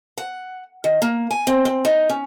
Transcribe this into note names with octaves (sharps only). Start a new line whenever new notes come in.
F#5
D#3
A#3
G#5
C4
C4
D#4
C#4